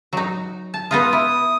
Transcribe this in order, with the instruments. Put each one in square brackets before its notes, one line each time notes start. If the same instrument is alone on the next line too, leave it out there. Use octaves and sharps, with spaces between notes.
[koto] F#3 D#4
A5
[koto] B3 D#4 F4 [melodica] D#6
[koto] E4